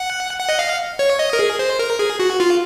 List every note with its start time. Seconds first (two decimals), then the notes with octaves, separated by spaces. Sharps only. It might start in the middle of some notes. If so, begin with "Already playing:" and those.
Already playing: F#5
0.39 F#5
0.49 D#5
0.59 F5
0.99 C#5
1.19 D#5
1.33 A#4
1.39 G#4
1.59 C5
1.79 A#4
1.99 G#4
2.20 F#4
2.40 F4